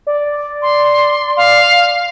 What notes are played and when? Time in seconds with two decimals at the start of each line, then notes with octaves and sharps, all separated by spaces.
0.07 D5
0.62 C6
1.37 F5